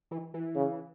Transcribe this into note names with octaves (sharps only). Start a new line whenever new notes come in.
E3
E3
C#3